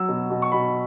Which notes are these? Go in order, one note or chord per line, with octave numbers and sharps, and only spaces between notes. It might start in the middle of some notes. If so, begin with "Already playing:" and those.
Already playing: F#3 E6
B2
B2
C#6
B2 B5